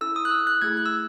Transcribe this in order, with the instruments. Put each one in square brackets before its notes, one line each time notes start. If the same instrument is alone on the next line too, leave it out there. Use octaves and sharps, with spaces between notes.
[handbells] C#4 E4 A4 E6
D#6
F#6
E6
F#6
A3 E4 G#4 G#6
F#6
E6